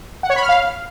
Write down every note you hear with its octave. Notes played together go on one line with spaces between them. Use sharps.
F#5
C#5
B5
F6
F5